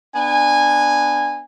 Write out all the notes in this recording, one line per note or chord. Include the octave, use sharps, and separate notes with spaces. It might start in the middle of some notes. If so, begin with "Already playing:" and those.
B3 D4 G#5